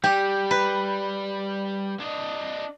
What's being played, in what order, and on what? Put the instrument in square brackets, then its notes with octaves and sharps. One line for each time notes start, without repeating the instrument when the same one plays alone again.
[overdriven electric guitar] G3 [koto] G4
[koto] B4
[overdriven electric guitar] D4 D#5